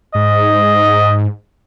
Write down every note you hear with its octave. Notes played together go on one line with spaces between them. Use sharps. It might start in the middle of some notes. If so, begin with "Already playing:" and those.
G#2 D#5